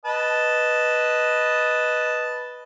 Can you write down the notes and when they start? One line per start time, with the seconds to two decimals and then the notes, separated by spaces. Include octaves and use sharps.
0.05 B4 D#5 A5